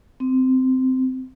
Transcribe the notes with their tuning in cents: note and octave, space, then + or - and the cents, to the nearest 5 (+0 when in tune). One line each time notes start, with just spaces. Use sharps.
C4 -15